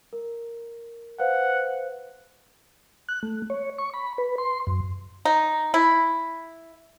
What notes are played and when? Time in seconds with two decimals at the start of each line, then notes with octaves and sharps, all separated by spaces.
0.13 A#4
1.19 B4 C5 F5 F#5
3.09 F#6
3.23 A3
3.50 C#5
3.78 C#6
3.94 B5
4.18 B4
4.38 C6
4.67 F#2
5.25 D#4
5.74 E4